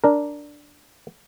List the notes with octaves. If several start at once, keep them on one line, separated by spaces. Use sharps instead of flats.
D4 A#4